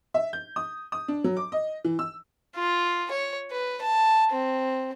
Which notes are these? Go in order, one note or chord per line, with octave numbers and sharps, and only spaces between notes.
E5
G6
D#6
D#6
D4
F#3
D6
D#5
E3
E6
F4
C#5
B4
A5
C4